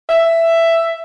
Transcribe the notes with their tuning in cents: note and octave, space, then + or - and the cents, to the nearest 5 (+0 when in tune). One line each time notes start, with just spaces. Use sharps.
E5 +10